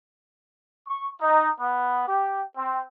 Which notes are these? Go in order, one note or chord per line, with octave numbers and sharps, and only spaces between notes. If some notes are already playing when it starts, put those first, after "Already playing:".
C#6
D#4
B3
G4
C4